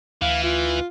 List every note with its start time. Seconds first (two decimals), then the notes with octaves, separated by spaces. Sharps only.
0.22 D2 E3 F5
0.43 F4